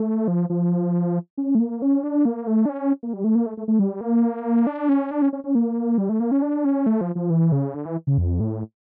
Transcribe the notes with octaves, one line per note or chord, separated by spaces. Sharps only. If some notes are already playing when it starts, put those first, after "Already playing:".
Already playing: A3
F3
F3
C#4
A3
A#3
C#4
D4
A#3
A3
D4
C#4
A#3
G3
A3
A#3
A3
A3
A3
G3
A#3
D4
C#4
D4
C#4
C#4
C#4
A#3
G3
A3
A#3
C#4
D4
C#4
A3
F3
F3
E3
C#3
D3
E3
C#3
F2
A2